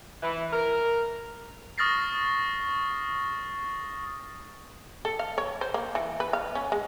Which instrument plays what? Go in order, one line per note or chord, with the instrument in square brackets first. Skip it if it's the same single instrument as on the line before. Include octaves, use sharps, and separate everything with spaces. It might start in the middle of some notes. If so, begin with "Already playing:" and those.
[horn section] E3
A#4
[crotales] C#6 D#6 F6 A6 A#6 C7
[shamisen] A4
F5
C#5
C5
A#3
E3
B4
F5
C#4
G#3